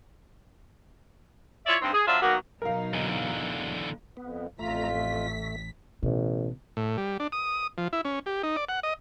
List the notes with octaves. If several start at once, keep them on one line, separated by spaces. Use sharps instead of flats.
E4 F4 C#5 D5 E5
G2 C4 D#4
G#4
F#3 D4 F4 C5 D5 E5
B2 D#3 F#3 A#3 F#4
B2 F#3 D#4 A#4 F5
E2 D3
F2 B3
A1 F2 A3 F4 A#5 B6
A3
A1 B2
A2
G3
D4
D#6
F3
E4
C#4
G4
D#4
D5
F#5
D#5